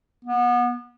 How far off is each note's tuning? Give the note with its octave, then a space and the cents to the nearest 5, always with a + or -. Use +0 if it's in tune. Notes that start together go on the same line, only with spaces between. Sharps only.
B3 -30